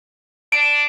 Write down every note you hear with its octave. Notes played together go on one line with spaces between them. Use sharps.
D4 D7